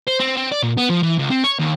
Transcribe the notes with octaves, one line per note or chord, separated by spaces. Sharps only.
C5
C4
C4
D5
A#2
B3
F3
E3
C#2
C4
C#5
D#2